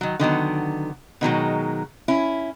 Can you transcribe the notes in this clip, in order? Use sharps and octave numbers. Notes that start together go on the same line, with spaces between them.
D#3 F#3
D3 D#3 F#3 B3
B2 D#3 F#3 G#3
C#4 E4